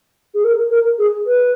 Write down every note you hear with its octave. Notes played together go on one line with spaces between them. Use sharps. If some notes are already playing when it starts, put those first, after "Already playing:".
G#4
A#4
A#4
G#4
B4